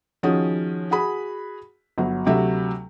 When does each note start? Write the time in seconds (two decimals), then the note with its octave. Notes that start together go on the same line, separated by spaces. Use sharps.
0.23 D#3 F3 C#4 F#4 G#4
0.91 F#4 G#4 B5
1.98 G1 F#3
2.26 D2 C3 F#3 A3 E5